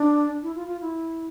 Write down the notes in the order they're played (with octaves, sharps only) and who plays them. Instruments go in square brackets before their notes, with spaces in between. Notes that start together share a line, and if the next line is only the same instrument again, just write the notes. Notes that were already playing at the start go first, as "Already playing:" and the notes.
Already playing: [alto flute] D4
E4
F4
F4
E4